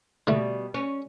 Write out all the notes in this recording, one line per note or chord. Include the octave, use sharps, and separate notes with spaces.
B2 D3 G3 A3
C#4